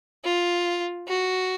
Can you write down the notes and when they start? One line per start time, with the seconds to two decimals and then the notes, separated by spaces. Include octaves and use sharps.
0.24 F4
1.08 F#4